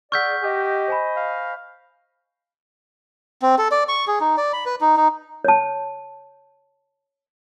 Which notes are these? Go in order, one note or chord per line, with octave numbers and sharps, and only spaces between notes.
G#4 D5 F#5 C#6 E6 F6 G6 B6
G4 D#5
C5 G#5 B5
F5
C4
A4
D5
C#6
G#4
D#4
D5
B5
B4
D#4
D#4
C#5 A5